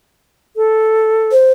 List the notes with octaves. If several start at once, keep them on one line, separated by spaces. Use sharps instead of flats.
A4
C5